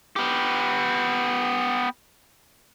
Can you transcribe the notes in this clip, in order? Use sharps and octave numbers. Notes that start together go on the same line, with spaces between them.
B3 G4